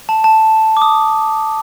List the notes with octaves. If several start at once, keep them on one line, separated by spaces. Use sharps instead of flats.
A5
A5
D6
D#6